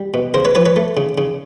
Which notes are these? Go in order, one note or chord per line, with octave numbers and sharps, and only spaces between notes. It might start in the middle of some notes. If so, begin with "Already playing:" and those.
Already playing: G3
B2
C#3 A#4 C5
B4 C#5
F3 B4 C#5
B4 C#5
A3
C#3
C#3